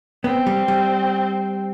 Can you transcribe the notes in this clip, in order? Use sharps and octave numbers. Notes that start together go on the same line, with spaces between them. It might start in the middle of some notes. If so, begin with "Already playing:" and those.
B3 C4
G3
G3